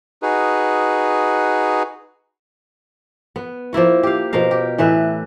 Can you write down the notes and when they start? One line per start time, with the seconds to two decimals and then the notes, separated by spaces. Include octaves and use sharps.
0.22 D#4 F#4 G#4 B4
3.36 B3
3.73 F3 A#3 E4 F#4
4.03 G4 F5
4.33 B2 F3 A#4 F5
4.51 G4
4.78 A2 E3 B4 E5